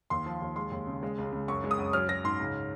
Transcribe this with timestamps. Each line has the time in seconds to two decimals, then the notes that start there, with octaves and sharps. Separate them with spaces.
0.10 D#2 C6
0.26 F3
0.42 D#2
0.56 G#3 C6
0.72 D#2
0.87 C#3
1.03 G#3
1.18 C#2
1.32 C#2
1.48 F#2 C#6
1.64 G#3
1.71 D#6
1.78 F#2
1.93 F#3 F6
2.09 F#3 A#6
2.24 G#2 C6
2.39 C#2